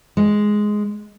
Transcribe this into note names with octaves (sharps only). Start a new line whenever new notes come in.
G#3